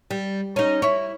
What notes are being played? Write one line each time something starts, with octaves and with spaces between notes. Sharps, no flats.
G3
C#4 D#4
E4 C#5